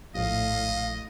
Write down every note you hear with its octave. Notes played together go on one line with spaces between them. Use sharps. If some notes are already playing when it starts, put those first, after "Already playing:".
A#1 A2 D#5 F5